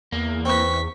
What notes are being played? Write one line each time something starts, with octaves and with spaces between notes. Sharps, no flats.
E2 A#3
C4 B4 C#6 B6